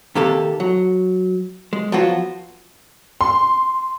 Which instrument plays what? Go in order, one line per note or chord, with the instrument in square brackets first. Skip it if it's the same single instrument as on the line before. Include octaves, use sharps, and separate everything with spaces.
[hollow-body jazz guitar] C3 D#3 A#3 G4 A4
F#3
G#3
F3 F#3 B3 F4 F#4
[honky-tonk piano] C6